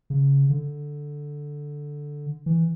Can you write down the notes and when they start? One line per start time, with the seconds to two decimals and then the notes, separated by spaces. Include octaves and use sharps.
0.10 C#3
0.50 D3
2.46 E3